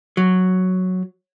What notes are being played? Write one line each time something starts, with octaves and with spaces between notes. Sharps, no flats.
F#3